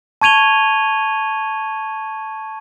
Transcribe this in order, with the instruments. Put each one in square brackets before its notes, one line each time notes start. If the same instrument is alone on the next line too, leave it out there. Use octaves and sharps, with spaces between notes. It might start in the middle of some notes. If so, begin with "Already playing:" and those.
[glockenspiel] A5 C#6 G#6 D#7 F7 G7